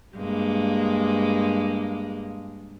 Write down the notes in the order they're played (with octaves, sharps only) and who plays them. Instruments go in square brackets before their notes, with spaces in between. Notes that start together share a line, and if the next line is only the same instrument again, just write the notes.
[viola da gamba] G2 G#3 A#3